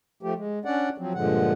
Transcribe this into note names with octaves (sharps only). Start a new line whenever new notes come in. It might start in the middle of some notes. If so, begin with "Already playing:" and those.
F3 A3 G4
G#3
C#4 D4 D5 F#5
F3 F#3 C4
G2 A#2 D3 F3 G#3 F#5